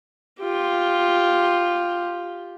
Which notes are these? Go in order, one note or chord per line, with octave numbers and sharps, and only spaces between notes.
F4 G4